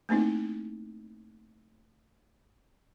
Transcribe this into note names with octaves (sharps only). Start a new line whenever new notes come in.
A3 A#3 C4 D#4 E4